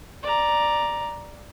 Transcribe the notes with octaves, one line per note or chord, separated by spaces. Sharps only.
D5 A#5